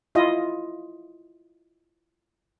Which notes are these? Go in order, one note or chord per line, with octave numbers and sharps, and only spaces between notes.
E4 F4 D#5